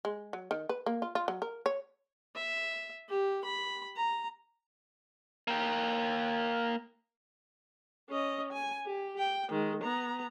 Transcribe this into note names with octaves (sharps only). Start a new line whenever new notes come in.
G#3
F#3
D#3
B4
A#3
F4
F4
F#3
A#4
C#5
E5
G4
B5
A#5
A#3 G5
C#4 D#5
G#5
G4
G5
D#3 G#3
B3 A#5